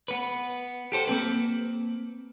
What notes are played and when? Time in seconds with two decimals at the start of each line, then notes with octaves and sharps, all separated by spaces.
0.08 B3 B4
0.92 G4 A4 C5
1.07 A#3 C4 B4